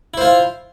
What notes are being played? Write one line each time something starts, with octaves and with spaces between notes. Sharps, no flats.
E4 F4 C5